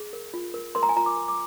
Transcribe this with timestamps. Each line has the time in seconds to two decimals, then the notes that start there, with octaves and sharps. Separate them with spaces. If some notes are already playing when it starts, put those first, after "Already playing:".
Already playing: G#4
0.13 A#4
0.34 F4
0.54 A#4
0.75 A#4 C6
0.83 A#5
0.89 G#5
0.96 F4 A#5
1.06 D6
1.17 A#4
1.28 D6